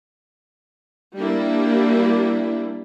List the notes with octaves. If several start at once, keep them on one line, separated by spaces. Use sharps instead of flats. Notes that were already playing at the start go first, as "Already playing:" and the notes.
G3 A#3 D4 E4